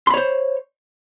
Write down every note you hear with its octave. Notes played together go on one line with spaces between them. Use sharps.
C5 C#5 B5 C6